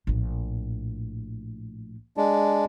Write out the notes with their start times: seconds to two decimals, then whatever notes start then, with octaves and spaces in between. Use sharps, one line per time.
0.07 A#1 A2
2.17 G#3 D4